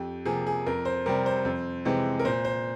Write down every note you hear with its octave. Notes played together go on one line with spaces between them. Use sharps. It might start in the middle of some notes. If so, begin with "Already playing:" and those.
Already playing: F2 G4
C3 F3 A#3 G#4
G#4
F2 A#4
C5
C3 G3 C4 A#4
C5
F2
C3 E3 G#3 C4
A#4
A#2 C5
C5